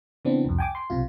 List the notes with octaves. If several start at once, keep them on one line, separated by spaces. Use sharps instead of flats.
C#3 E3 B3 C4 D4
C2 F2
G5 G#5 D6
C6
B1 C3 F4